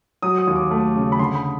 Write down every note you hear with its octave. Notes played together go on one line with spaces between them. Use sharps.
F#3 D#6
D#6
D#2
D6
A3
C#3
B5
D3 C6
B5